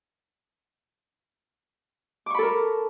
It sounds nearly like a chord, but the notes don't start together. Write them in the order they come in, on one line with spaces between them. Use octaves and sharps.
D6 C#6 B5 A4 A#4